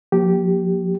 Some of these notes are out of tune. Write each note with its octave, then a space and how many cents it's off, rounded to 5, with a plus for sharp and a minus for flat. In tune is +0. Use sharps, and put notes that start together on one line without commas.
F3 +40 A#3 +20 G4 -10